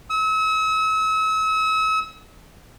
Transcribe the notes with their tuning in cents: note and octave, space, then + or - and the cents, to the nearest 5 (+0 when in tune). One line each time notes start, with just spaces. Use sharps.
E6 -40